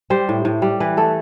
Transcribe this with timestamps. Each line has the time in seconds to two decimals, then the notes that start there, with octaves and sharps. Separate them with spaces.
0.10 G3 C5
0.29 A2
0.45 A2
0.62 G3
0.80 E3 B4
0.97 A3 A4